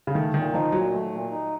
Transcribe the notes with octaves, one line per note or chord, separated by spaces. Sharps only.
C#3
D#3 A3
A#2 D#3
F3 D#4
A#2 F#3
A3
A#2
D#4